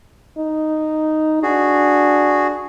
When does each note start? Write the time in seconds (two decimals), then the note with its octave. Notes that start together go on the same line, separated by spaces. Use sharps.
0.38 D#4
1.43 D4 F#4 G#4